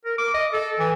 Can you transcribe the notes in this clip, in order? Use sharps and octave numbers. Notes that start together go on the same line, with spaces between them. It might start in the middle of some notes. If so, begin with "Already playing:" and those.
A#4
D6
D#5
A4
E3